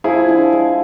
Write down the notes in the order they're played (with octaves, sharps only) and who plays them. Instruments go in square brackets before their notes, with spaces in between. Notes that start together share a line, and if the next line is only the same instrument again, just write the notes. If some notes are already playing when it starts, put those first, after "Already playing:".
[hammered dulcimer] F3 [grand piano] E4 G#4
[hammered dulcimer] D3
G#3